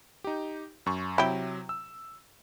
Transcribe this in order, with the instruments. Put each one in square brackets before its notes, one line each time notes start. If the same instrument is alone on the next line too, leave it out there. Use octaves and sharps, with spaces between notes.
[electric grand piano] D#4 G4
F#2 C#6
[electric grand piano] C3 F#3 [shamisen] E4 G4
[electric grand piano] E6